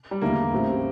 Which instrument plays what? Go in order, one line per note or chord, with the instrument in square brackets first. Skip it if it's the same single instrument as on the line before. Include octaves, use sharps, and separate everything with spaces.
[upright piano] G3
[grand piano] E2 D3 A3 E4 [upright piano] A#3
[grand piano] A1 A2 G3 C4 E4